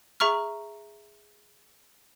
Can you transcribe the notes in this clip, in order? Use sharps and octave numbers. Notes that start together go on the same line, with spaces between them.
G#4 E5 A#5 C#6 F6